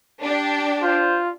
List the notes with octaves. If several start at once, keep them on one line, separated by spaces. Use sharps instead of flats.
D4 G4
F4 C5